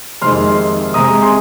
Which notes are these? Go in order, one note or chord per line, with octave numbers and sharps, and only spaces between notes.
F2 C3 D#3 G#3 C6 F6
C3 G#3 A#5 D#6
A#5 D#6
G#5 C6